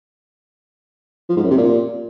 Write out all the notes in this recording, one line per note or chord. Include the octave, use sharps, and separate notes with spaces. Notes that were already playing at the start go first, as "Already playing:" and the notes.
F3
G#2
F#2
C3
A#2